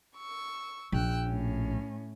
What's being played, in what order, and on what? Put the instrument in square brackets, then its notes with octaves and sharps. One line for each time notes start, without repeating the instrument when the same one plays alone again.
[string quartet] C#6 E6
[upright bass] A#1 [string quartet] G5 E6 F#6
[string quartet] A2 C#4